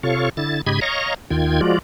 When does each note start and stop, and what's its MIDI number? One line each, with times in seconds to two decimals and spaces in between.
0.03 0.29 48
0.03 0.29 65
0.03 0.29 69
0.03 0.29 73
0.03 0.29 77
0.03 0.29 85
0.37 0.61 50
0.37 0.61 64
0.37 0.61 93
0.67 0.80 44
0.67 0.80 49
0.67 0.80 67
0.67 0.80 75
0.67 0.80 83
0.67 0.80 92
0.81 1.14 73
0.81 1.14 75
0.81 1.14 77
0.81 1.14 82
0.81 1.14 85
1.30 1.61 39
1.30 1.61 51
1.30 1.61 65
1.30 1.61 79
1.30 1.61 92
1.61 1.78 53
1.61 1.78 56
1.61 1.78 65
1.61 1.78 66
1.61 1.78 74